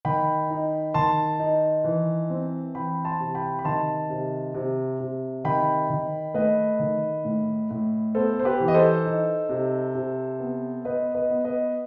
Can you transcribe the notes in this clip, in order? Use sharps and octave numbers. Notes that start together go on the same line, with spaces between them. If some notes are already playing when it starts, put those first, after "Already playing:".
D#3 G5 B5
D#4
D#3 A5 C6
D#4
E3
C4
E3 G5 B5
A5 C6
C3
G5 B5
B5
D#3 A5 C6
C3
C3
C3
D#3 G5 B5
D#3
A3 B4 D#5
D#3
A2
A2
B3 A4 C5
C5
G4 B4
E3
D#5
A4 C5
D#4
C3
C3
B3
B3 B4 D#5
B4 D#5
B3
B4 D#5